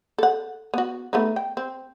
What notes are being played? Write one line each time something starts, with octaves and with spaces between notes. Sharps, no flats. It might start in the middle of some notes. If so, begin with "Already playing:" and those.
A4 F#5
B3 F#4
A3 B3 D#4
G5
C4